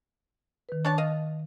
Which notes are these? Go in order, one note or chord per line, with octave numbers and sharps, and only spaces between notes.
D#3 B4
D4 C#5 A5
D#5 F5